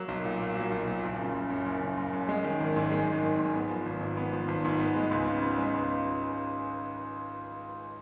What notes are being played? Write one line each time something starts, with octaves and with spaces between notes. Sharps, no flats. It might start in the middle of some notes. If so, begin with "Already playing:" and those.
Already playing: F#3 A#3
B1
A#2
A#3
F#3
B1
A#2
F#1
C#3
F#1
F#2
F#1
C#3
F#1
F#2
G#3
D#3
G#1
G#2
G#3
D#3
G#1
G#2
B3
F3
G#1
G#2
B3
F3
G#1
G#2
B3
G#3
C#2
C#3
B3
G#3
C#2